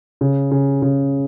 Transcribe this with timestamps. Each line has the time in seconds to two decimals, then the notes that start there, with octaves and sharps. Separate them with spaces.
0.21 C#3
0.51 C#3
0.82 C#3